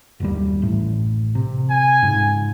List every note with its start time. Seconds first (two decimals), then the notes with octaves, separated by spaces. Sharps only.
0.20 F#1 D#2 G3
0.62 A1 A2
1.35 C3
1.70 G#5
2.03 G#2 C#3